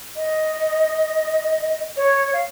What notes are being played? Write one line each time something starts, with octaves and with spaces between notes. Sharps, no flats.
D#5
C#5
F5